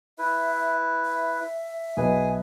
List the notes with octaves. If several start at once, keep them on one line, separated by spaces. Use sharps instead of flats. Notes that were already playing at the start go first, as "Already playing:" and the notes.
E4 B4 E5
E5
B1 G#4 B4 D#5 G#5